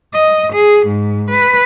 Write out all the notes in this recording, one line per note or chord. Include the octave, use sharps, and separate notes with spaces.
D#5
G#4
G#2
B4